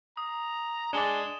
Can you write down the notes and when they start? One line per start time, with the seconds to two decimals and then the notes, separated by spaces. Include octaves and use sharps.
0.17 A#5 D#6
0.93 G#3 D4 G#4 D5 E7 G7